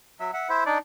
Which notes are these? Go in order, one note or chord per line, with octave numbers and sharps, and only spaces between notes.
F#3 E5
E5 F#5
E4 C5 E5
D4 D#4 D5